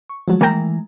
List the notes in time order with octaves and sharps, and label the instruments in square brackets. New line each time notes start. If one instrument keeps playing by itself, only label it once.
[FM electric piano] C#6
[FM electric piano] D#3 G#3 A3 [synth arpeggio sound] F3 F#3
[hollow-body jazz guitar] E3 A#5 [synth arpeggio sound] A#3 A#4 G5